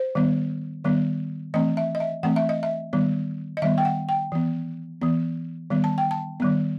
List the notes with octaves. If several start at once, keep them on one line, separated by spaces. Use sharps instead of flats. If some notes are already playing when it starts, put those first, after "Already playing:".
Already playing: C5
D#3 G3 B3
D#3 G3 B3
E3 A3 C4 D#5
E5
D#5
E5
E3 A3 C4 F#5
E5
D#5
E5
D#3 G3 B3
D#5
D#3 G3 B3 E5
G5
F#5
G5
E3 B3
E3 B3
D#3 G3 B3
A5
G5
A5
D#3 G3 B3